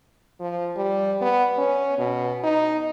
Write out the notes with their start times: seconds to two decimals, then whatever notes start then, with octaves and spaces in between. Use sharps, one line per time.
0.41 F3
0.77 G3
1.21 B3
1.58 C#4
1.99 B2
2.44 D#4